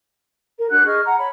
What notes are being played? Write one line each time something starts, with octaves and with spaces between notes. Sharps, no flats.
A#4
D4 F#4 F#6
G#4 D#5 C#6 F6
F#5 A#5
C#5 B5